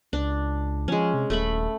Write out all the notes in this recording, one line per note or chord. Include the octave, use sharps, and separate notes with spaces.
C#2 D4
F3 G#3 C#4
C3
D#1 A3 E5 B5